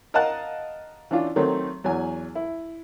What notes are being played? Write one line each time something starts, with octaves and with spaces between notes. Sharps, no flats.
A#4 D#5 F5 F#5 A5 F#6
E3 C#4 D4 F4
D#3 F#3 A3 C4
E2 F#3 G#5
E4